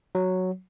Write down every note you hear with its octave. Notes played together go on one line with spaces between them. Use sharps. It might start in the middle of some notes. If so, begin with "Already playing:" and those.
F#3